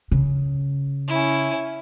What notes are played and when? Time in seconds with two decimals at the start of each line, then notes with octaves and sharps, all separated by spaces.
0.12 C#3
1.08 C#4 E4